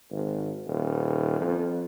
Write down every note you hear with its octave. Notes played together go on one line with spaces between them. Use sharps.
G#1
D#1
F2